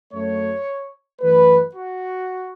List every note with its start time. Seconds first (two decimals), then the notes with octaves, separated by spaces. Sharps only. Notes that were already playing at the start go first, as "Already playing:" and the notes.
0.13 F#2 F#3 A3 C#5
1.20 F#2 E3 A3 B4
1.75 F#4